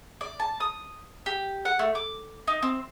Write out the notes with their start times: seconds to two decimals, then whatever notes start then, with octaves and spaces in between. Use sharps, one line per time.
0.21 D5
0.40 A5
0.60 D#6
1.26 G4
1.65 F#5
1.79 A3
1.95 D6
2.48 D#4
2.62 C4